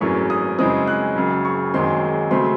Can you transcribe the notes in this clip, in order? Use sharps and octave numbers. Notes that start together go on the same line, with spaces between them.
G#1 F#2 E3 A3 C#6
D#6
F#2 C#3 E3 G#3 C4 D#6
F#6
F#1 F#2 C#3
C#6
F#1 F#2 D#3 G#3 C4 C6
C#3 F#3 A3 C4 C6